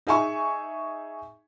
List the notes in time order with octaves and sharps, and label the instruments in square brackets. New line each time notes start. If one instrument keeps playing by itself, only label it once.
[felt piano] D#4 G#4 E5 G#5 C#6